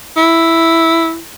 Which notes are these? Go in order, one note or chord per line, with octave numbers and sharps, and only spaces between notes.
E4